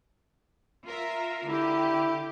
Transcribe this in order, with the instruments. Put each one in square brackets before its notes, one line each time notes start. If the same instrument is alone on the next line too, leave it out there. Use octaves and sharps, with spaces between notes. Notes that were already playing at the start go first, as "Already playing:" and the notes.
[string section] F4 A#4 E5
[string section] D3 G4 [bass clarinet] E4